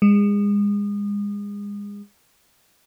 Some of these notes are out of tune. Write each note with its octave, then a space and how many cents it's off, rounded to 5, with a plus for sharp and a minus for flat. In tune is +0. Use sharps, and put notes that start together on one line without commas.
G#3 -30